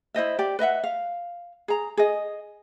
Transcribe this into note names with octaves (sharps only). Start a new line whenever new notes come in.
E4 C5 D#5 E5
G4 D5
B4 D#5 E5 F#5
F5
G#4 A#5
G#4 D#5